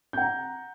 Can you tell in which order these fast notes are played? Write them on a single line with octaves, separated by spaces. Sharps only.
G6 F#5 A#5